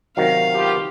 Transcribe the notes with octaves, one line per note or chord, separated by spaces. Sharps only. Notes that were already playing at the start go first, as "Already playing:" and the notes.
C3 D#3 F#3 F5
B2 F4 G4